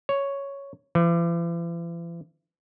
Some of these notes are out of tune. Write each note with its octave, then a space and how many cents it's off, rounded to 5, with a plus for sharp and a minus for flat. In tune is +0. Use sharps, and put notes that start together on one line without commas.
C#5 +0
E3 +45